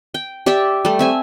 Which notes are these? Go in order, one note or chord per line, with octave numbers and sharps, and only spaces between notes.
G5
G4 D5 E5 G5
G3 A3
C4 E5 G#5